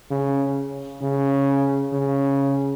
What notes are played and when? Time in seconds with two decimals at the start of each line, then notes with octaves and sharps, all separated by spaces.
0.11 C#3
1.02 C#3
1.93 C#3